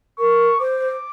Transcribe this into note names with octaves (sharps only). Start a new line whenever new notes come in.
A#4 C#6
C5 D6